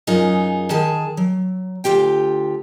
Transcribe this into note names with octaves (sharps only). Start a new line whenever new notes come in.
F#2 D#4 F4 G#4
D#3 G#4 A5
F#3
D2 F3 F4 G4 G5